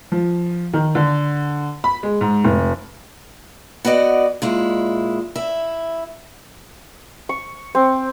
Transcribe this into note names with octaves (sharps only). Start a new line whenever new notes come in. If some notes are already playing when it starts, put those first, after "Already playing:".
F3
D#3
D3
B5
G#3
G#2
F1
B3 F#4 D5 D#5
A#2 G#3 E4
E4 E5
C#6
C4